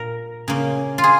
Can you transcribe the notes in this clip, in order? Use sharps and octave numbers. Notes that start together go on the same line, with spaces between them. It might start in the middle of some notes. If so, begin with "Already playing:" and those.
Already playing: A#2 A#4
C#3 A#3
F4
G#4